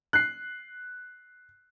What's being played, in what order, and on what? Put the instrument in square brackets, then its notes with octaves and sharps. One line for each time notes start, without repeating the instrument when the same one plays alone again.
[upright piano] F#6 C7